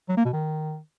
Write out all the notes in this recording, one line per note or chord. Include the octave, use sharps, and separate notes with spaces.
F#3
A#3
B2
D#3